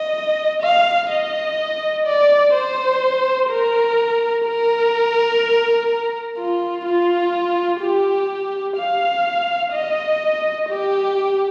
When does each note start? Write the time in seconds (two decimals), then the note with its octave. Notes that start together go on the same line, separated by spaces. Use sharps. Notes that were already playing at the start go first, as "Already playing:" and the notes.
Already playing: D#5
0.62 F5
1.10 D#5
2.06 D5
2.54 C5
3.50 A#4
4.46 A#4
6.38 F4
6.85 F4
7.81 G4
8.77 F5
9.73 D#5
10.69 G4